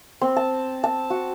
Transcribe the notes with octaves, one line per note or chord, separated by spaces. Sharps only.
C4
A5
A5
F#4